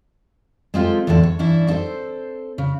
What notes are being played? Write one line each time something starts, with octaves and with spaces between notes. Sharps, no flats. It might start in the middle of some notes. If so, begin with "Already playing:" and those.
G#3 C4 F4 G4 A4
E2 A2 D3 A4 C5
C#5
G2 E3 C#4 D4 E4
C4 D#4 E4 A4 C5
C#3